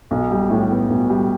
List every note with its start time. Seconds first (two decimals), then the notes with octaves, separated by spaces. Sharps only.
0.11 B1
0.31 G3
0.50 A2
0.71 B3
0.90 B1
1.10 G3